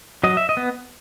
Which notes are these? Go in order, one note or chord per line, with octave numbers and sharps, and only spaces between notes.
F#3 D#5
E5
D#5
B3